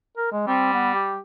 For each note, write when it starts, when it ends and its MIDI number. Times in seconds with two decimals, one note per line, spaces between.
0.17 0.28 70
0.32 0.45 56
0.47 1.19 55
0.47 0.73 60
0.74 0.93 59
0.95 1.18 67